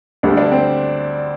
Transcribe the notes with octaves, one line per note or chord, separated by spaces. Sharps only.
D2 D3 G3 D4
D4
C4